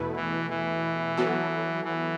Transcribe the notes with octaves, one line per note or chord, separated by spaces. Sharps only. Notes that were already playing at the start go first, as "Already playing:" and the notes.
Already playing: E2 B2 A3 E4 B4
E3
E3
F#3 B3 F#4 A4
E3